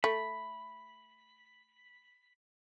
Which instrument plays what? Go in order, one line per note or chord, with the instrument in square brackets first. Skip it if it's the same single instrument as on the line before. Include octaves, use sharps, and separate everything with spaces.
[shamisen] A3 [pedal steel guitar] B5